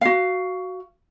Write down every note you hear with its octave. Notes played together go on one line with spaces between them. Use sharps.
F#4 F5